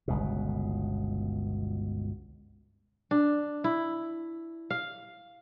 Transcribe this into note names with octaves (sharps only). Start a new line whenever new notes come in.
G1 C#2 B2
D4
E4
F5